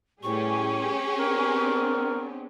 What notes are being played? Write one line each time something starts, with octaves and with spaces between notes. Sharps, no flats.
A2 G3 A3 C#4 G4 G#4 B4 C#6
B3 C4 D4 A#4